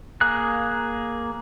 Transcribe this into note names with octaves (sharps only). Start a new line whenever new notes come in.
A#3 G#4 F#6